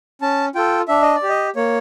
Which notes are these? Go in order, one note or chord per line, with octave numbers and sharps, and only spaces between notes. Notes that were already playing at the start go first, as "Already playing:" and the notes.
C#4 A5
F4 A4 G5
D4 E5
D#5
D5
G4
D#5
A#3 C#5